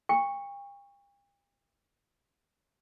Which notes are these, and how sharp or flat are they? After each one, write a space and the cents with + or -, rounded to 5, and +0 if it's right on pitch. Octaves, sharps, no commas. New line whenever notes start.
G5 +40 C#6 +0